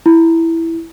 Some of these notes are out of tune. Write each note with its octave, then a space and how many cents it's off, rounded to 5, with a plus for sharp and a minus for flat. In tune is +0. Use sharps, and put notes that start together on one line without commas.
E4 +0